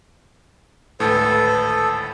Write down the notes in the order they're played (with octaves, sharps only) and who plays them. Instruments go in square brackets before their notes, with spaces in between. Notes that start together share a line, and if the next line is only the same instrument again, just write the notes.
[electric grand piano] G#1 D2 A2 [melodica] A4 [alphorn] B4